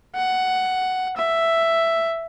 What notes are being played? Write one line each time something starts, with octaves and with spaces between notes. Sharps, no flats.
F#5
E5